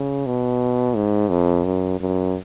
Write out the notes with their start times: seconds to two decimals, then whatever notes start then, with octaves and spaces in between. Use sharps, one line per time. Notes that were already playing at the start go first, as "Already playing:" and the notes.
Already playing: C#3
0.26 B2
0.96 G#2
1.30 F2
1.65 F#2
2.00 F#2